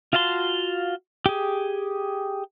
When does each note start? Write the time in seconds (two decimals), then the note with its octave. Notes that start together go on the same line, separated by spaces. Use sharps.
0.13 F4 F#4 F5 A5 C6
1.26 G4 G#4